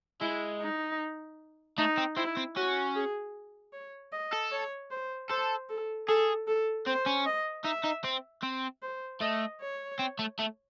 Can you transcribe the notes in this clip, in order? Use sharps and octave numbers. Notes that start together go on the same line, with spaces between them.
G#3 E4
D#4
A3 D#4
C4
C4 E4
C4
C#4 F#4
G#4
C#5
D#5
A4
C#5
C5
A4 C5
A4
G#4 A4
A4
C4 C5
C#4
D#5
D#4 E5
D#4
C4
C4
C5
A3 D#5
C#5
C4
A3
A3